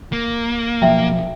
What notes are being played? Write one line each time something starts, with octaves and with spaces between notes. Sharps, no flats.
A#3
B2 F3 F#3 E5 G5